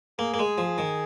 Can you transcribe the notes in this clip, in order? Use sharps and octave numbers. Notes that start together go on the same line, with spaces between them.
A#3 G#4
A#3
G#3
F3
D#3